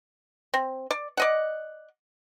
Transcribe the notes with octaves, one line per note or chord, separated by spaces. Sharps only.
C4
D5
D5 D#5 F#5